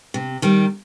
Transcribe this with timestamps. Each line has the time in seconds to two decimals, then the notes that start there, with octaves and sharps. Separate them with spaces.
0.14 C3
0.42 D#3 G3